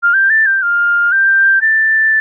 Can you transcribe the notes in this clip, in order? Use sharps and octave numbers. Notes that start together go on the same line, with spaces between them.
F6
G6
A6
G6
F6
G6
A6